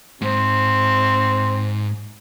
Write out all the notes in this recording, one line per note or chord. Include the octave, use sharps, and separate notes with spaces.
G#2 C4